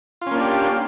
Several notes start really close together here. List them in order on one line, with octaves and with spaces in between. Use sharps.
F4 C#4 A#3 D4 G4